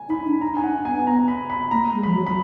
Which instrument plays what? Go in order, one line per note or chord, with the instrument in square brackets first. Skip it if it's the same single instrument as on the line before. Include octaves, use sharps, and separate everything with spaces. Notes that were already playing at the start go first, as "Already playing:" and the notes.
Already playing: [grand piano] G#5
[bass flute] D#4 [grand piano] B5
[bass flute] D4
[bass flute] D#4 [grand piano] A#5
[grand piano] G#5
[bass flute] D4 [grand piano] F#5
[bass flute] B3 [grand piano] G#5
[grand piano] A#5
B5
B5
[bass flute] A#3 [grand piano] A#5
[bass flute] G#3
[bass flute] F3 [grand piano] B5
[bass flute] F#3
[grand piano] B5